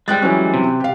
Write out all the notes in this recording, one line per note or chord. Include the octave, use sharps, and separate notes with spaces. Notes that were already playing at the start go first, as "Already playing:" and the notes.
G3 G#3 G5 F#6 A6
E3 F#3 C#4
C3
G4 F5